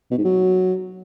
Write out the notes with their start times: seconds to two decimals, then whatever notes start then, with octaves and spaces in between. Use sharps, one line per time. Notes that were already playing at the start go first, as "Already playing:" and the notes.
0.11 B2
0.18 G#2
0.25 F#3